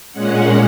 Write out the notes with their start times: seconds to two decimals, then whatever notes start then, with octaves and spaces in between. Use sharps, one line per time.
0.13 A#2 G#3 C#4 F#5